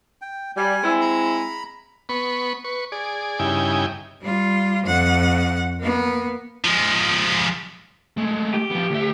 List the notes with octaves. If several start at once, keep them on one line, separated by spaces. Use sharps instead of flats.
G5
G3 G#5
G#3 C4 E4
A#5 B5
B3 B5 C#6
B4 C#6
G#4 D5
G2 C#3 D#4 E4 G5 G#5
G3 F4
F2 F#5
A#3 B3
F3 G#3
G#3 A3
G4
F3 B3
D2 E5